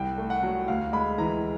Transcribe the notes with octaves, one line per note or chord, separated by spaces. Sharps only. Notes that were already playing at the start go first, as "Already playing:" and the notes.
Already playing: C2 G5
A3
F#5
F#3
D2 F5
G#3 B5
E3 A#5